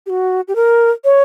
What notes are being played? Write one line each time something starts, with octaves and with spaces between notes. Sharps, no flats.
G4
F#4
G4
A#4
C#5